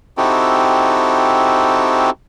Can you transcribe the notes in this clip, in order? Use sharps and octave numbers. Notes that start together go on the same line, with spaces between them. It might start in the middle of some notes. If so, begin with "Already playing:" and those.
C4 D#4 E4 F#4 G4 A4